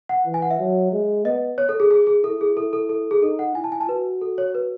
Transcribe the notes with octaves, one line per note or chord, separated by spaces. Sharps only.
F#5
E3
G#5
F#5
E5
F#3
G#3
B3 D#5
C#5
A4
G#4
G#4
G#4
E4 A4
G#4
E4 A4
A4
A4
G#4
D#4 A4
F#5
E4 G#5
A5
G#5
A5
F#4 B4
A4
C#5
B4